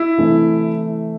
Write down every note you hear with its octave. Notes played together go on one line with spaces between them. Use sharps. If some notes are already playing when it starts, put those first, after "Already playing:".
Already playing: E4
C3 E3 A3